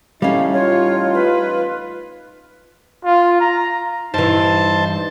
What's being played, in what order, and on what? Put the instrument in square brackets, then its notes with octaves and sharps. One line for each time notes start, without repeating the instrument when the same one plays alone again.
[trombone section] A1 A2 D#4 [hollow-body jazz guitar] G3 C#4 [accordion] A3 [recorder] F5
[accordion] F4 [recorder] C#5
[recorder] B4
[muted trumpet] F4
A#5
[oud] G2 E3 [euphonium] D#4 [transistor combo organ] C5 A5